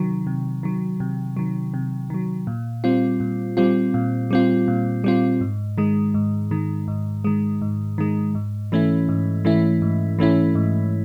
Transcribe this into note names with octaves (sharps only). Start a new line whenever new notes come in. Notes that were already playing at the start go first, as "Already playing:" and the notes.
Already playing: C3 D#3 F#3
C3
D#3 F#3
C3
D#3 F#3
C3
D#3 F#3
A#2
G3 C4 F4
A#2
G3 C4 F4
A#2
G3 C4 F4
A#2
G3 C4 F4
G#2
D#3 G#3
G#2
D#3 G#3
G#2
D#3 G#3
G#2
D#3 G#3
G#2
E3 A3 C#4 E4
G#2
E3 A3 C#4 E4
G#2
E3 A3 C#4 E4
G#2